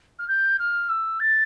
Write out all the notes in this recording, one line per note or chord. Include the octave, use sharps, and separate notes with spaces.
F6
G6
F6
E6
A6